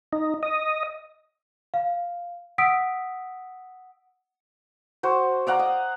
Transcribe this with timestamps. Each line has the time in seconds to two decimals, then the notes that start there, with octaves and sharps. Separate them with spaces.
0.13 D#4
0.43 D#5
1.74 F5
2.58 F#5 D#6 E6 B6 D7
5.03 F#4 C5
5.47 D5 F5 F#5 A#5
5.59 D#5